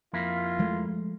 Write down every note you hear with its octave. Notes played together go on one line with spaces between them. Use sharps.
F2 A#3 E4 F4
F3 G#3 A3